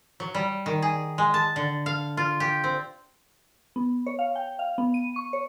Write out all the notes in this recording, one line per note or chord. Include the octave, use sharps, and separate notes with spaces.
F#3
G3
D#3
G#4
G#3
A5
D3
F5
F4
G4
C4
B3
C#5
F5
G5
F5
B3
D#7
C#6
C#5